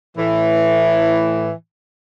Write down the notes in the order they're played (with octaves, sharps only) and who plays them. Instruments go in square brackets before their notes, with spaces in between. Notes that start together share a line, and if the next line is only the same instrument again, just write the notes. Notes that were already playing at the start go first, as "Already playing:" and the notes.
[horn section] A2 E3